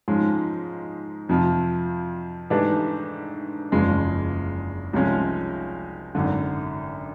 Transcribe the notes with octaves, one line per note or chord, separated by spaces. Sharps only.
G#2 F3 G#3 C#4
F2 C3 F3
G#2 E3 A3 D4 G4
F#1 E2 C#3 F3 G#3
C2 C3 F3 G#3 C#4
G#1 F#2 D3